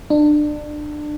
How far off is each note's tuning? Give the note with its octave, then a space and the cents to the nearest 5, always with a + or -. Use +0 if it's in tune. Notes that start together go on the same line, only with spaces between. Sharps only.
D4 +25